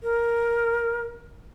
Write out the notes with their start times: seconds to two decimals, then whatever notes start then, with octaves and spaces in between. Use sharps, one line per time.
0.03 A#4